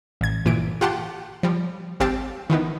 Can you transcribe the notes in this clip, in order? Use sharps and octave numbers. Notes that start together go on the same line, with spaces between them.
A1 G#6
G1 A#2 E3 D7
F4 G4 F#5 G5 A5 C6
F3 G3
G#1 C4 G4 F5 G5 A5
D#3 E3 B3 D#4